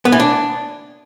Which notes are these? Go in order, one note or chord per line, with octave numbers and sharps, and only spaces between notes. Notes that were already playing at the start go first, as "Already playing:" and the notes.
B3
E3
D4